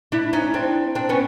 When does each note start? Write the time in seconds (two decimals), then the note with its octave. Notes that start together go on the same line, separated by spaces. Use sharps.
0.12 D4 E4
0.33 C#4 D#4
0.54 C4 D4
0.95 C4 D4
1.09 B3 C#4